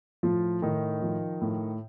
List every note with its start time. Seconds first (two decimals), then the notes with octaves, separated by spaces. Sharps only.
0.23 A2 F3 F4
0.62 A2 D#3 D#4
1.02 F3
1.41 A2